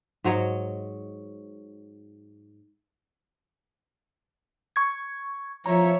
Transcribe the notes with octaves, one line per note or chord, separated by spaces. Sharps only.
G#2 F#3 C#5 D#5
C#6 G#6
F3 C#5 E5 A#5